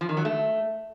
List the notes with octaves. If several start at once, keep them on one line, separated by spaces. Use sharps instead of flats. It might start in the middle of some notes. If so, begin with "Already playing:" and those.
F3
D#3
F#3
A3